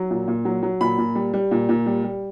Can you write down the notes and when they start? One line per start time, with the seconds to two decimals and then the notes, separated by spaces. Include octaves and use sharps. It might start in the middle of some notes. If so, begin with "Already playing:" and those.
Already playing: F#3
0.10 A#2
0.28 A#2
0.45 F#3
0.63 F#3
0.81 A#2 B5
0.98 A#2
1.15 G3
1.34 G3
1.51 A#2
1.69 A#2
1.86 G3
2.03 G3